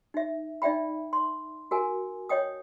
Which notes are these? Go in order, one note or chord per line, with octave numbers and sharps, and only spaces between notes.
D#4 E5
D#4 D5 E5 G5 B5
C6
F#4 A#4 G#5
C#5 D#5 G5 D#6